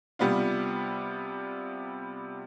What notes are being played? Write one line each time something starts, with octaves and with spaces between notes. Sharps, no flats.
C3 G3 B3 D4 F4